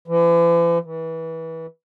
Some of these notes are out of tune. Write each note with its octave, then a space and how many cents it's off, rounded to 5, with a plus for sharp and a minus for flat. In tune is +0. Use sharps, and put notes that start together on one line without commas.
E3 +45
E3 -25